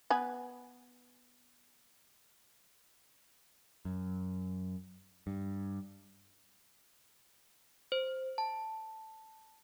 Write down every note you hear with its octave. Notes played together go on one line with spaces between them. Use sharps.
B3 B4 G#5
F#2
G2
C5
A5